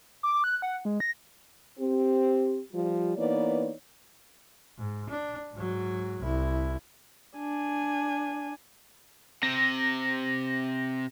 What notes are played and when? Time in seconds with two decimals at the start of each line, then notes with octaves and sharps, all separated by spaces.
0.23 D6
0.44 F#6
0.62 F#5
0.85 G#3
1.00 A#6
1.78 C4 G4
2.73 F3 G3 F4
3.16 E3 A#3 B3 D#4 C#5 D5
4.79 G#2
5.10 D4
5.54 G#2 F#3
6.20 C2 E4
7.37 D4 G#5
9.43 C3 A#6